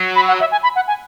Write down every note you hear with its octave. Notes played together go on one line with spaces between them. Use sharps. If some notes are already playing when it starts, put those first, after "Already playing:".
Already playing: F#3
B5
F#5
E5
G#5
B5
F#5
G#5